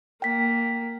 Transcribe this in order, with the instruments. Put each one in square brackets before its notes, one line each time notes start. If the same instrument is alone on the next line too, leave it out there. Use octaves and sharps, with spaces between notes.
[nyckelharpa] A#3 [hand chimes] G5 B6